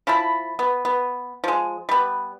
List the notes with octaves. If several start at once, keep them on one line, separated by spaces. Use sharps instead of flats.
F3 E4 A5 B5
B3
B3
F3 G#3
G3 B3